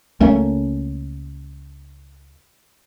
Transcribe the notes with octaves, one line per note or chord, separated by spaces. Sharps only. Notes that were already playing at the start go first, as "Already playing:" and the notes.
C#2 A3 A#3 C#4